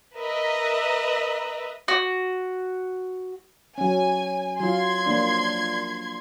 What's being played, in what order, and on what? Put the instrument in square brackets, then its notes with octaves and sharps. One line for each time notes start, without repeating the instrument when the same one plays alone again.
[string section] A#4 B4 D#5 E5 A#5
[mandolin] F#4
[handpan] F#3 C#4 [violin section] G#5
[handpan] F#3 F4 [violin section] C6 G#6
[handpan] F3 A#3 D4